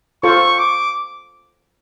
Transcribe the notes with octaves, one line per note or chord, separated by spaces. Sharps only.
F4 A4 C5 C#6
D6